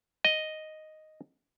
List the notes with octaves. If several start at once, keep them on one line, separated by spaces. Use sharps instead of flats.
D#5